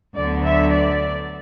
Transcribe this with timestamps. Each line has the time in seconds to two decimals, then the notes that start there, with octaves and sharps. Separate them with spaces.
0.15 D2 D3 F#3 B3 D5
0.44 E5
0.72 D5